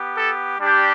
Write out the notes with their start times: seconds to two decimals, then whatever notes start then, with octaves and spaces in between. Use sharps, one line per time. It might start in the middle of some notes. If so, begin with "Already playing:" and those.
Already playing: B3 G4
0.14 A4
0.60 G3 D4 G4